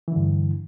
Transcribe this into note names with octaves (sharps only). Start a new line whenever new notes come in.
G2 D3 E3